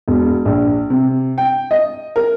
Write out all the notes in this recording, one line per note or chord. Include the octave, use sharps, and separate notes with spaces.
E1
A#1
C3
G5
D#5
A#4